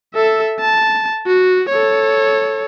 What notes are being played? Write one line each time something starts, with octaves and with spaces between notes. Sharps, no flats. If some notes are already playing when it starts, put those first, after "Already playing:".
A4 E5
A5
F#4
A4 C#5